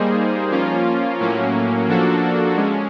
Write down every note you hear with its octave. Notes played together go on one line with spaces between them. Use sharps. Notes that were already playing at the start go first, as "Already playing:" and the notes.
Already playing: G3 A#3 D#4 G#4 C5
F3 A#3 C#4 F4
A2 F#3 A#3 C#4
F3 A#3 D4 F#4 A4
G#3 C#4